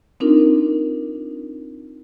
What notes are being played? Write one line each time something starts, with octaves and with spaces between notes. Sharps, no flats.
C4 D4 D#4 F4 A#4